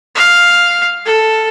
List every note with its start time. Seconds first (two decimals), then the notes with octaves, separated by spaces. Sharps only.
0.15 F5
1.05 A4